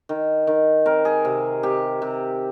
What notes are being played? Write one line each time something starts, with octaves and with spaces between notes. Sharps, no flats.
D#3
D#3
C4 A#4
G#4
C3
C3 G4
C3